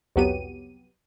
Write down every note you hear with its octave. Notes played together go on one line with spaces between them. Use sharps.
C2 F2 F#3 B3 G4 D#7